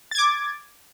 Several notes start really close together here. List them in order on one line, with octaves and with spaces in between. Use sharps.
A6 G#6 D6